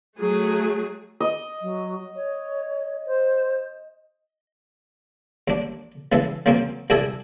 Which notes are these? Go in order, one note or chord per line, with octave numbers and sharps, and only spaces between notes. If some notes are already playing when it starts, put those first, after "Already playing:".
F#3 A3 G#4
D#5
F#3
C#5
C5
D#2 D4
C#3 E3 G#3 A4
C#3 F#3 A#3 C4 C#4
C2 G2 D4 E4 G#4 A4